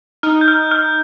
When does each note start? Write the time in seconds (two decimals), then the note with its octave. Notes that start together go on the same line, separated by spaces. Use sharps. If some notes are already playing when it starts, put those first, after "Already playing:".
0.23 D#4 F6
0.41 G6
0.48 F6
0.71 F6